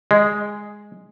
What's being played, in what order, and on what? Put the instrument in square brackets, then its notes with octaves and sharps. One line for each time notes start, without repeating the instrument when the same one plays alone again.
[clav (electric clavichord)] G#3